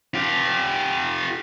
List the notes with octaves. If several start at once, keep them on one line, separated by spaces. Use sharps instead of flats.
F4 G4